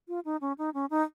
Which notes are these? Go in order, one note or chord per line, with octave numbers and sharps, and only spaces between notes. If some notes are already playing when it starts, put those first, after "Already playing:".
F4
D#4
C#4
D#4
C#4
D#4